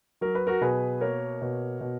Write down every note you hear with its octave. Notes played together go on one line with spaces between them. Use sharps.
F#3 A#4
B4
F#4 A#4
B2 G#4 B4
A#3 A#4 C#5
B2
B2